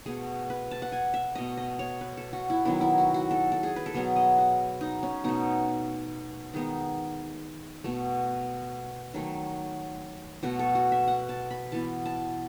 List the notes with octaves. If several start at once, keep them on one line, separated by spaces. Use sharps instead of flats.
B2 A3 G#4
B4
A5
F#5
G#5
E5
B2 A3 D#5
D#5
C#5
B4
A4
F#4
E4
D#3 F#3 B3 E4
E4
F#4
F#4
A4
A4
G#4
B4
A4
B2 F#3 B3 G#4
D#5
F#4
D#4
C#4
B2 A3 D#4
D#3 G#3 B3 D#4
B2 A3
D#3 F#3 A3
B2 A3 F#4
A4
F#4
E5
F#5
A5
B5
E3 B3 A5
A5